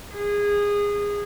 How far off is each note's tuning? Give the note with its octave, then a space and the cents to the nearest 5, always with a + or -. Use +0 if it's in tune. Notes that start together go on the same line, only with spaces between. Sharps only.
G#4 -20